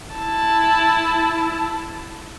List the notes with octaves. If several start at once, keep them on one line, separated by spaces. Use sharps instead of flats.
E4 A5